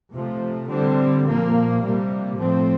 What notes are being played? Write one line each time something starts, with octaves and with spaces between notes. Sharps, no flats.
C3 F3 A3
D3 G3 C4
A#2 F3 A#3
C3 G3 A#3
A2 F3 A3 C4